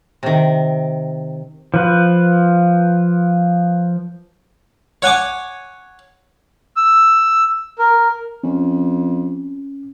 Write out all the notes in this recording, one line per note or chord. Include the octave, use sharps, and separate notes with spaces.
C3 D#3
F3 B4
C#5 F#5 G#5 D6
E6
A#4
F2 C#4